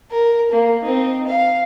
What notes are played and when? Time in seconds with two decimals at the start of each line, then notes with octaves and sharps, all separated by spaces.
0.11 A#4
0.51 A#3
0.82 C4 D#4
1.27 F5